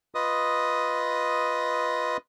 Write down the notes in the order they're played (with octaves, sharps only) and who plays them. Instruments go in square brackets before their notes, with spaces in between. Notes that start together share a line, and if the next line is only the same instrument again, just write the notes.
[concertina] F4 B4 D#5 D#6